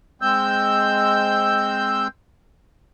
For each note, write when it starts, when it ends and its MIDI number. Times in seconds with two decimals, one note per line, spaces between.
0.22 2.08 56
0.22 2.08 60
0.22 2.08 88
0.22 2.08 91